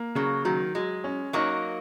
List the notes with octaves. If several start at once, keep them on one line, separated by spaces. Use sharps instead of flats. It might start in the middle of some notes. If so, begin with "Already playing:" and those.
Already playing: A#3
C#3 F#3
D#3 F#3
F#3 G#3
C#4
F#3 A#3 D#4